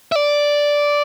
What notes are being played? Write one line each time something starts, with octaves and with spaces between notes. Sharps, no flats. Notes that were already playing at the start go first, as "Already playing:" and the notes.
E5
D5